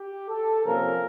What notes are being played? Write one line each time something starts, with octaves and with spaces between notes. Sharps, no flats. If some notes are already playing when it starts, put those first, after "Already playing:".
Already playing: G4
A4
C3 F3 A#3 C#4 A#4